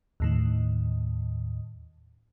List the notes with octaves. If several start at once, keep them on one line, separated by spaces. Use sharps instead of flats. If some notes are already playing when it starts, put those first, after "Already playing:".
D#2 A2 D#3